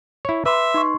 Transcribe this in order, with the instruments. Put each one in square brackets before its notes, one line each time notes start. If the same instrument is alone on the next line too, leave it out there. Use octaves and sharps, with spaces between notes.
[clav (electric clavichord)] E4 C#5
[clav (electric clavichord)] B4 [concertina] E5 [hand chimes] C6 D6
[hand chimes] D#4 C6 C#6